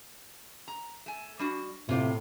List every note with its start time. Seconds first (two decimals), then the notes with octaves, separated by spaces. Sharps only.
0.68 A#5
1.06 A3 G#5
1.39 G3 D4 F#4
1.89 A2 C3 F4 G4 F5